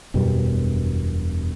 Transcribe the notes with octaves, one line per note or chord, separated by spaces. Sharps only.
E1 F#2 B2 G3